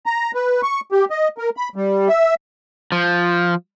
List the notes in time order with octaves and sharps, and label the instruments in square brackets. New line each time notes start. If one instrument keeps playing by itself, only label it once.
[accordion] A#5
B4
C#6
G4
D#5
A#4
B5
G3
E5
[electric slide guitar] F3